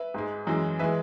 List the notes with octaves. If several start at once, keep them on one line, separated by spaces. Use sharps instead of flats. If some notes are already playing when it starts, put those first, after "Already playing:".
Already playing: B4 E5
G#2 G#3
F#2 E3 G#3
E3 G#3 B4 E5